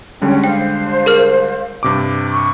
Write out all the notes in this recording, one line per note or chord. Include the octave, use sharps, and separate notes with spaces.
D3 G3 G#3 C#4 C#5 G5
C5 F5 G5
G#4 A#4 F6
G2 C3 D6
C#6